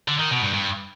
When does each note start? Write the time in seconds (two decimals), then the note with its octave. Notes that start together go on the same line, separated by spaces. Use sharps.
0.08 D3
0.19 D#3
0.31 B2
0.42 G2
0.53 G2